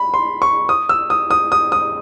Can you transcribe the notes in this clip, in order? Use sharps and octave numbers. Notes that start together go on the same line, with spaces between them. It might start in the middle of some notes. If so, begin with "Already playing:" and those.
Already playing: B5
C6
C#6
D#6
E6
D#6
D#6
D#6
D#6